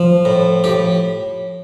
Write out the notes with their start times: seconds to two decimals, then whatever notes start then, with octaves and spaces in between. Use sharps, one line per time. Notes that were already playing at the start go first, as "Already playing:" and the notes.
Already playing: F3
0.25 A2
0.64 A2 G4